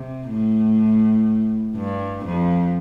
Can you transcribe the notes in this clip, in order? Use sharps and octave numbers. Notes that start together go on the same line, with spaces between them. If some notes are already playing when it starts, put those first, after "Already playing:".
Already playing: C3
A2
G2
F2